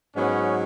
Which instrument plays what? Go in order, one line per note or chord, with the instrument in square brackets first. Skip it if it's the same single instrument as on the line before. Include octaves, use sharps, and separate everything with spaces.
[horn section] G#2 F#3 B3 C#4